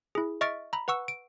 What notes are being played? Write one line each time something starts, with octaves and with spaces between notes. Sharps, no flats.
E4 G#4
D#5 E5 C#6 F6 A6 D7
A#5 B5
B4 F#5 C#6 E6
D7